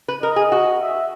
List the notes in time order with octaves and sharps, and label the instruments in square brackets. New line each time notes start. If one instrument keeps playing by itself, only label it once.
[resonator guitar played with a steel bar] B4
[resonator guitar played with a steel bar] A#4 [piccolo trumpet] D#5
[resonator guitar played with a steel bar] G#4
F#4
[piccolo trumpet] E5